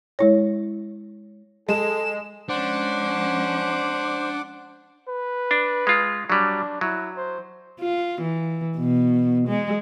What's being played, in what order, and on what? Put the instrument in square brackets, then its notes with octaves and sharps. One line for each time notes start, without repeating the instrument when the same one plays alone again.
[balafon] G#3 E4 C#5
[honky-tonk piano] G#3 [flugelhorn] A4 [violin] E7
[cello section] F3 G#3 C#4 [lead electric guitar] D4 [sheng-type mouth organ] C5 [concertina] F#5 D6
[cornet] B4
[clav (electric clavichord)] D4
G#3 F4
[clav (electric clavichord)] F#3 G3 [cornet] D4
[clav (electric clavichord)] F#3 [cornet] E4
[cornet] C5
[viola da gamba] F4
E3
B2
G#3